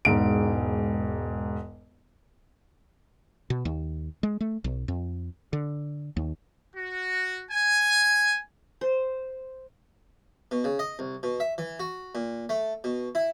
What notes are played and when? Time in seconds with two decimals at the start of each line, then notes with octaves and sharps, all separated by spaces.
0.05 E1 G#2 D7
3.50 B2
3.65 D#2
4.23 G#3
4.41 A3
4.64 B1
4.88 F2
5.53 D3
6.17 D#2
6.76 F#4
7.51 G#5
8.81 C5
10.51 B2
10.64 C#3
10.79 D#5
10.99 C2
11.23 B2
11.40 E5
11.58 E3
11.79 F#4
12.15 A#2
12.49 A3
12.84 B2
13.15 E4